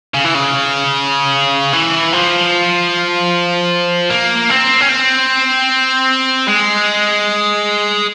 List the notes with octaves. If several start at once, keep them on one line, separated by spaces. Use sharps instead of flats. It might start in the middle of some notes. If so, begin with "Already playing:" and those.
C#3
E3
C#3
E3
F3
A#3
C4
C#4
C4
G#3